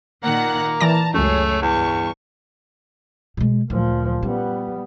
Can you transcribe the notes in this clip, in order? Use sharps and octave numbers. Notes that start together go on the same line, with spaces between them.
A#2 D#3 A#3 F#5
E3 D5 A5 A#5 A#6
C#2 F#2 A3 G#4 C#5
E2 G2 C#6
B2 G#3
D2 A#2 F3
G3 B3 C#4